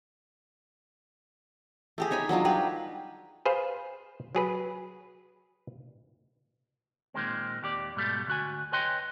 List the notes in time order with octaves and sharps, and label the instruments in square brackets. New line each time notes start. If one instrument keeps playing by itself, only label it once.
[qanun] A3 G4 G#4
D#4 C#5 G#5 B5
F#3 D4 D#4 F4
G3 G4 G#4 B4
[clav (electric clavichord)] G#4 B4 C5 F5
F#3 G#4 B4
[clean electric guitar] A#2 D#3 G#3 C4
D#2 G4 D5
G#2 B2 G3 A3
D2 F#4 G#5
B4 C#5 D#5 G5 G#5 C6